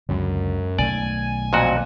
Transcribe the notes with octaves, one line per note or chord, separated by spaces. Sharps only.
C#2 F#2 D3
B1 D#3 A3 D5 G#5
F2 A#2 F#4